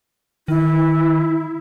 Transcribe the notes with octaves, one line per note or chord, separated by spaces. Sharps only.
D#3 E4